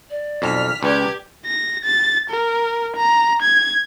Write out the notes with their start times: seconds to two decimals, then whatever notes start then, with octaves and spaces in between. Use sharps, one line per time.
0.10 D5
0.42 B1 F2 F6 B6
0.83 C#2 G4 B4 D5 G#6
1.45 A#6
1.85 A6
2.30 A#4
2.96 A#5
3.42 G#6